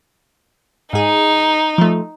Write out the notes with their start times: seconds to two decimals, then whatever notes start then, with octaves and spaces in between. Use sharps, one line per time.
0.93 G#2 D#4 G#4
1.78 F3 A3